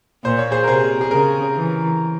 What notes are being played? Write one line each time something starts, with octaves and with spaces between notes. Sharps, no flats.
A#2 C5
C#5
G#4 C5
A#4
C3 G#4 C5
G#4
C#3 A#4
E3